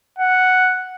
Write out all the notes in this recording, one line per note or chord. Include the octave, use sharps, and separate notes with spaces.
F#5